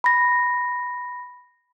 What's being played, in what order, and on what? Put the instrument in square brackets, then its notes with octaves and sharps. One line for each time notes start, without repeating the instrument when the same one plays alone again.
[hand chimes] B5 A#6